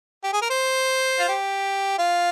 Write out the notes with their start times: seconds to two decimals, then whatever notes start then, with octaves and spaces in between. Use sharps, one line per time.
0.24 G4
0.33 G#4
0.42 A#4
0.50 C5
1.20 F4
1.29 G4
1.99 F4